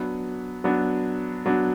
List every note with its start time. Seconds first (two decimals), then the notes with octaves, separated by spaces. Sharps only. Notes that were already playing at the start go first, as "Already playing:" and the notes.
Already playing: F#3 B3 D4
0.64 F#3 B3 D4
1.46 F#3 B3 D4